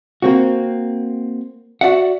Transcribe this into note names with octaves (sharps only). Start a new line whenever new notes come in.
A#3 C4 F#4
F#4 D5 E5 F#5